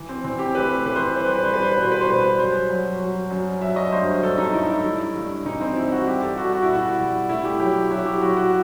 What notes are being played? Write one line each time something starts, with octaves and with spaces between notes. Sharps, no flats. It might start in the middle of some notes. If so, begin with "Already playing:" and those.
Already playing: E3
C4
E3 C4
G4
A3 B4
E3 B4
C5
G3 B4
C5
B4
G3 C5
B4
C5
B4
B2 C5
B4
C5
G3 B4
F#2 C5
F#3
F#3
F#2
F#3 E5
D#5
G2 C5
G2 A4
D#4
A3 E4
E4
G2
G2
E3 D#4
C4
G2 E4
F#4
G3 G4
A4
G3 F#4
F#4
E4
B2 F#4
G3
A3 E4
G4
F#3 G4
F#3 E4
G4
F#3 F#4
F#4